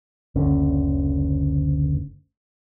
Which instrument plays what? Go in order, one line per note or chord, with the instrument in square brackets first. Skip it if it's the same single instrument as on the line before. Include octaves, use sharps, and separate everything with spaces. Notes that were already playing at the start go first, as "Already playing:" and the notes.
[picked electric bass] F#1 D2 D3 C#4